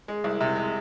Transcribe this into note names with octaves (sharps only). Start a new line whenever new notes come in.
G#3
C2
C3
G#3